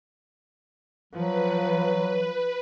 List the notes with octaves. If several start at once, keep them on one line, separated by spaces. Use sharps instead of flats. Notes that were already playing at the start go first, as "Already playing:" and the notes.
F3 F#3 B4